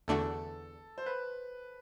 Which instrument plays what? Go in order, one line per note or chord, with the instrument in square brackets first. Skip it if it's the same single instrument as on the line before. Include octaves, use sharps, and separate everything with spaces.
[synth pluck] E2 D3 A3 D4 F#4 [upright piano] A4
[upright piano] C5
B4